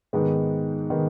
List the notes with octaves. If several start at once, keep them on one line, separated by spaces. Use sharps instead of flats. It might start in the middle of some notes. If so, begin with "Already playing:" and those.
G#2 D#3 G#3 B3
D#3 G#3 B3